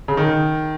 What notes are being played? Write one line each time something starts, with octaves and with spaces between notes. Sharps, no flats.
C#3
D#3